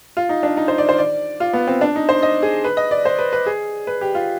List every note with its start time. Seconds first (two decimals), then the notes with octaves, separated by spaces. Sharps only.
0.17 F4
0.29 D#4
0.43 D4
0.57 D#4
0.68 C5
0.78 D5
0.89 C5
0.98 D5
1.40 F4
1.53 B3
1.68 C4
1.81 D4
1.96 D#4
2.09 C5
2.23 D#5
2.43 G#4
2.64 B4
2.77 D#5
2.91 D5
3.05 C5
3.19 B4
3.33 B4
3.46 G#4
3.87 B4
4.01 G4
4.15 F4